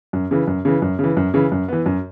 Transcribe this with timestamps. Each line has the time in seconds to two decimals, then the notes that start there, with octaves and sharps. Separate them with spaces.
0.13 F#2
0.31 C#3 E3
0.47 F#2
0.65 C#3 E3
0.82 F#2
0.99 C#3 E3
1.17 F#2
1.34 C#3 E3
1.52 F#2
1.68 E3 B3
1.86 F#2